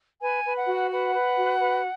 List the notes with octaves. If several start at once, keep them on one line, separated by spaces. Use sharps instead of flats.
B4 G#5
B4
F#5
F#4
B4 F#5
B4
F#4
B4